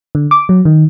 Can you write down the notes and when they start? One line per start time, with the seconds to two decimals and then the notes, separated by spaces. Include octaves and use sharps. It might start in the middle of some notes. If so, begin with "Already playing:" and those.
0.15 D3
0.31 D6
0.49 F#3
0.65 D#3